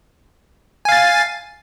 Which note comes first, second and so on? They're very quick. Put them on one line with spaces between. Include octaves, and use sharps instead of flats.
G#5 F5 A6